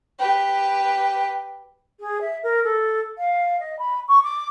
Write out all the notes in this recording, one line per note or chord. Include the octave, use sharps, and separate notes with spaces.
G4 B4
G#4
E5
A#4
A4
F5
D#5
B5
C#6
D6